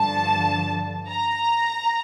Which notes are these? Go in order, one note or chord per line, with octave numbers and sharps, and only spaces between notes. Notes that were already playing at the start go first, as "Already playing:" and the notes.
Already playing: G2 D3 F3 A5
A#5